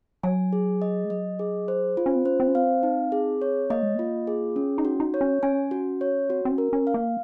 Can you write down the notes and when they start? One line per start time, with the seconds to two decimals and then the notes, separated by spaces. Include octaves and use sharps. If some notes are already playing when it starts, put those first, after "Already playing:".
0.23 F#3 G#5
0.53 G#4
0.82 D#5
1.05 G#3
1.10 F#3 D#5
1.39 G#4
1.68 C5
1.97 D#4 F4
2.06 C#4
2.15 C4
2.25 C#4 C5
2.40 C4
2.48 C#4
2.55 C4 F5
2.83 D#4
3.12 G#4
3.42 C#5
3.70 A#3 D#5
3.83 G#3
3.95 A#3 F4
4.27 G#4
4.56 C#4
4.78 D#4
4.85 F#4
5.00 D#4
5.14 C#5
5.21 C#4
5.43 C#4 G#5
5.71 F#4
6.01 C#5
6.29 C4 F#4
6.45 C4
6.51 C#4
6.58 A#4
6.73 C#4
6.87 F5
6.94 A#3